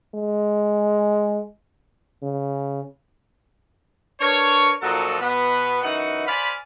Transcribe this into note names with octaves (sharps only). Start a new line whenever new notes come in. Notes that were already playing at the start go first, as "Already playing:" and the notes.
G#3
C#3
D4 A#4 B4 C#5
A#2 F3 F#3 D#4 F#4 A4
B2 B3 B4
F#2 E3 D#4 F#4 F#5
C5 D5 F5 G#5 B5